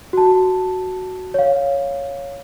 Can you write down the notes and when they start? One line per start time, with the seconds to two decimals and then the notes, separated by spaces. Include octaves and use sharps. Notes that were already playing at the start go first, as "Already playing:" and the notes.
0.13 F#4 A5
1.34 C#5 F5